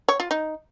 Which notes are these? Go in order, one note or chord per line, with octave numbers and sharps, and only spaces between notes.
C#5
F4
D#4